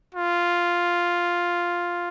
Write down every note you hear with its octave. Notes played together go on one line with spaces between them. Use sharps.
F4